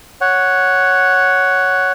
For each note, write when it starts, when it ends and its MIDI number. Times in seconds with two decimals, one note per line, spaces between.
0.21 1.92 73
0.21 1.92 78